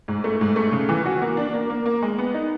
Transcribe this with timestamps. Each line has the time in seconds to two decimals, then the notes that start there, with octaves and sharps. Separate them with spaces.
0.08 G#2
0.24 A3
0.41 G#2
0.56 A3
0.72 C#3
0.89 E3
1.06 F#4
1.22 A#3
1.37 D4
1.54 A#3
1.70 A#3
1.86 A#3
2.02 G#3
2.18 B3
2.34 D#4